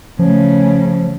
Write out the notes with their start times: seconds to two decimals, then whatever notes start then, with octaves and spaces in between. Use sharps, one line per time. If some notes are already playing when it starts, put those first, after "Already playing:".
0.19 C#3 F3 A3